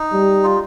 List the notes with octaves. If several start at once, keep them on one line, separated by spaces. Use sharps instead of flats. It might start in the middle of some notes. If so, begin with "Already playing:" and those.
Already playing: D#4
G3
F4